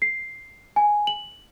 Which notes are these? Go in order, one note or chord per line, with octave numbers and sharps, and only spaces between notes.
C7
G#5
F#7